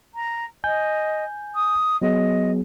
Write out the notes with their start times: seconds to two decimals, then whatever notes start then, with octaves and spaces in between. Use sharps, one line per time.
0.14 A#5
0.64 D#5 G#5 G6
1.55 D#6
2.02 F#3 B3 G#4 D#5